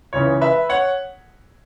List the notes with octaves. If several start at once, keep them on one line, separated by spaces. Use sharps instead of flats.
C#2 C#3 E3 C#5
B4 E5
C#5 F#5